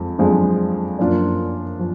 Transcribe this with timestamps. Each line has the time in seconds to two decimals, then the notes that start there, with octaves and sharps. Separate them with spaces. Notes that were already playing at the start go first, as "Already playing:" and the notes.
Already playing: F2 F3 G#3
0.18 F2 F3 G#3 D4
0.99 F#2 F3 A#3 D4 F4
1.79 F3